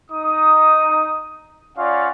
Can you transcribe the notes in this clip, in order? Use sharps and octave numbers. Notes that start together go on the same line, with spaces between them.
D#4 D#6
C#4 F4 D5 F5 F#5